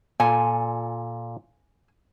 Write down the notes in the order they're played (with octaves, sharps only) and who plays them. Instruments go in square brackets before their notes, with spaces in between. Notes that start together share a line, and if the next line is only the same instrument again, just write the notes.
[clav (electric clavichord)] A#2 A4 [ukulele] G#5